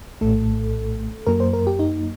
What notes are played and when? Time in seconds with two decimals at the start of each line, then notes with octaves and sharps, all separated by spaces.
0.21 A#1 A2 A3 A4
1.27 F#2 F#3 A#3 A#4
1.40 C5
1.53 A#4
1.67 G4
1.79 D#4